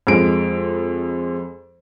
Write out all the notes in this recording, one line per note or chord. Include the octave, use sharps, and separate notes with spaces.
F2 G#3 D7